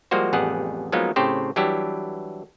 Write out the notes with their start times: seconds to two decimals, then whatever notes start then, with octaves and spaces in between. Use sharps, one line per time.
0.11 F3 G3 G#3 A#3 F#4 C5
0.33 A1 F2 G3 B3 G#4 F#5
0.92 F3 F#3 G#3 A#3 B3 D#4
1.16 A2 C#3 C4 G4 C5
1.56 E3 F#3 G3 D4 E4 G4